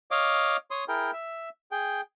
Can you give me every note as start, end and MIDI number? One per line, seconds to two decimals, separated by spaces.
0.11 0.57 73
0.11 0.57 75
0.11 0.57 77
0.11 0.57 86
0.71 0.84 73
0.71 0.84 84
0.71 0.84 87
0.88 1.11 64
0.88 1.11 68
0.88 1.11 70
0.88 1.11 79
1.13 1.49 76
1.72 2.01 68
1.72 2.01 79